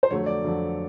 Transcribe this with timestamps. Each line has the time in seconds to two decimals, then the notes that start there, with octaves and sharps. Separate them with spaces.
0.03 C5
0.10 F2 D3 F#3 A3 C#5
0.26 D5
0.42 F2 D3 F#3 A3